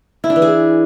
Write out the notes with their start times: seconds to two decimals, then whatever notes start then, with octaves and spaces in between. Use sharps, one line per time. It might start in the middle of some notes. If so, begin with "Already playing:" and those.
0.24 E4
0.30 D4
0.36 E3
0.42 G#4